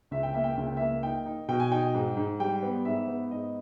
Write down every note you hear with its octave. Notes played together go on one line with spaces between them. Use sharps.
C#2 E5
G5
A#3 E5
G5
C#2 E5
G5
A#3 E5
D#4 G5
D#4
B2 G5
G#5
D#4 G5
G#2
G#2
G3 G5
B3
G#2 E5
B3
G#2 D#5